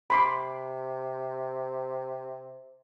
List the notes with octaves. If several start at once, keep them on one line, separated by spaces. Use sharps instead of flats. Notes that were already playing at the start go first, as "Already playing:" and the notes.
C3 B5 C6 D6